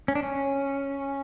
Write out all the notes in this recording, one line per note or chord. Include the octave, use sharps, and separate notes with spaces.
C#4
D4
C#4